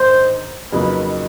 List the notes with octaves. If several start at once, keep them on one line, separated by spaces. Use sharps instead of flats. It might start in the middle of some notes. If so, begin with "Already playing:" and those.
Already playing: G#2 D#3 D4 C5
F2 C#3 F#3 A#3 D#4 B4